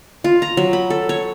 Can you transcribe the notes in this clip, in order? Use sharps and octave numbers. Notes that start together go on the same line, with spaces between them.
F4
A#5
F#3
B5
A4
C#5